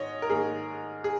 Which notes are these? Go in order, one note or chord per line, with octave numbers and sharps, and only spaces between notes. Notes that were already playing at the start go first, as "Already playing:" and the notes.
Already playing: G#2 D#3 C#5 D#5
A#4
G#2 D#3 A#3 G#4
G#4